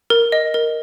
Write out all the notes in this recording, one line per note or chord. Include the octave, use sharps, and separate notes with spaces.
A#4
D#5
A#4